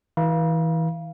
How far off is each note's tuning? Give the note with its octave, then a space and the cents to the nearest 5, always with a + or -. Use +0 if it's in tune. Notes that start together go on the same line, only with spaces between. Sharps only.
E3 -30 F5 -15 B5 -45